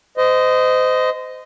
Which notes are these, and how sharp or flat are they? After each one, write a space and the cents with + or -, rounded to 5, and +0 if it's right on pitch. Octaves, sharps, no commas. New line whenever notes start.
C5 -30 D#5 +0